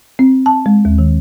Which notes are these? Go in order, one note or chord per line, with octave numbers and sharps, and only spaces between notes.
C4
A5
G#3
D#2
D#3